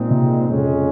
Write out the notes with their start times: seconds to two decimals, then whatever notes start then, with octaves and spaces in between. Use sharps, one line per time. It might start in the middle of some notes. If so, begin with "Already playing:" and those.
Already playing: A#2 G#3 C4 D#4
0.11 C3
0.48 F2 C#3 G#3 C#4